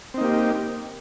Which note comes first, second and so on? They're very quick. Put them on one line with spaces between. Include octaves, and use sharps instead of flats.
C4 D#4 A#3 G4